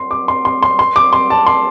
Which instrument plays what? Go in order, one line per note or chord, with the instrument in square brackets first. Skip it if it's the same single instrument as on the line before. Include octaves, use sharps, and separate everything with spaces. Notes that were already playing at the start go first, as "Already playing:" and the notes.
Already playing: [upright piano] C6
D6
C6
C6
C6
C6
D6
C6
A5
C6